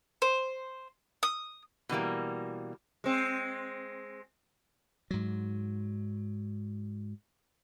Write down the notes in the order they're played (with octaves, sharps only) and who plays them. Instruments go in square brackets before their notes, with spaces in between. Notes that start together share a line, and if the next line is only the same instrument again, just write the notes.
[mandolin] C5
D#6
[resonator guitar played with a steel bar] B2 E3 G3 A#3
[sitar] G#3 C4
[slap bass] G#2 F#3